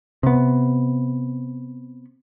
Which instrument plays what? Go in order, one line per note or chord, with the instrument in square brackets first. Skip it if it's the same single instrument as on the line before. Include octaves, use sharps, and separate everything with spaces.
[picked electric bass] C3 B3